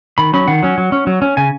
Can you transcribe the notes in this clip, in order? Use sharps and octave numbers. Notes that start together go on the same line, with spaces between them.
D#3 B5
F#3 C#4 B5
D#3 F#5
F#3 C#4
F#3
C#4
F#3
C#4
C#3 G#5